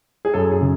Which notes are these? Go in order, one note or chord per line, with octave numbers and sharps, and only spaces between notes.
G#4
F#2 A4
G#4
C#3